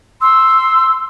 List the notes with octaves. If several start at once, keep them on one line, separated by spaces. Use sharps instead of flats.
C6 E6